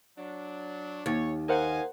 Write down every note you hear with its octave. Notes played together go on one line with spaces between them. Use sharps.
F#3 D4
D#2 C#5
A#4 C5 D#5 F5 F#5 G#5